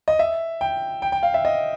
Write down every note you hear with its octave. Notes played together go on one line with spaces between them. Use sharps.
D#5
E5
G5
G5
G5
F5
E5
D#5